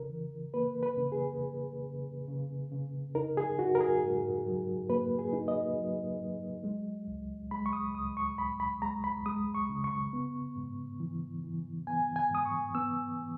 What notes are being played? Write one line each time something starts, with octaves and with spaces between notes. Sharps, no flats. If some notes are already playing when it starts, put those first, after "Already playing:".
Already playing: C#3 A#4
E3
A#3 B4
B4
C#3
G#4
C#3
C#3
C#3
C#3
D#4 A#4
G#4
D#4 F#4
A#4
G#4
G#2
F#3
A#3 B4
G#4
D#4
D#5
F#3
F#3
G#3
C#2
G#3 B5
C#6
D#6
C#2 D#6
C#6
C#2 B5
B5
G#3 A#5
B5
G#3 D#6
C#6
C#3
C#6
B3
G#2
E3
E3
B3 G#5
G#5
G#2 D#6
C#6
B3 E6
E3